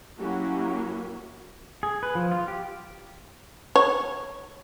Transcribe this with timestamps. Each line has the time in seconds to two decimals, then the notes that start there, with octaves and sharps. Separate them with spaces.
0.18 F#3 A#3 C#4 E4 F#4 G4
1.83 G#4
2.03 B4
2.15 F3
2.32 F4
2.48 G4
3.76 C#5